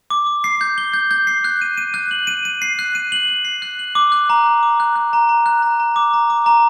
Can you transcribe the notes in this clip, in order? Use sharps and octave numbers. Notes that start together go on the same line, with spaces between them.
D6
D6
C7
G6
G7
G6
G6
C7
F#6
D#7
D#7
F#6
F#7
D#7
D#7
C7
F#6
D#7
F#7
F#7
C7
F#6
F#7
D6
F#6
A#5
F#6
D6
F#6
F#6
A#5
A#5
F#6
A#5
A#5
D6
A#5
D6
A#5